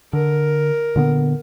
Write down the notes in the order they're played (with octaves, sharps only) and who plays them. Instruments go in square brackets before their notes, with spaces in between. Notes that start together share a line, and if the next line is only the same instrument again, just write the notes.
[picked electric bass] D3 [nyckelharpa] A#4
[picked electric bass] A#2 D3 B3